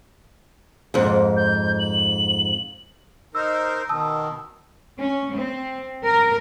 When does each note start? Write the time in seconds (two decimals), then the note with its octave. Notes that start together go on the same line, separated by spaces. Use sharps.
0.94 F2 G#2
1.37 G6
1.79 F#7
3.35 D#4 A#4 C5 E6
3.89 B2 D#3 A5 D#6 E6
5.00 C#4
5.34 C4
6.03 A#4